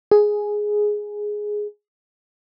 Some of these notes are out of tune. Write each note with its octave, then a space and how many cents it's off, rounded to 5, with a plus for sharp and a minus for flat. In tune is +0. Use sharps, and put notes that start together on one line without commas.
G#4 +5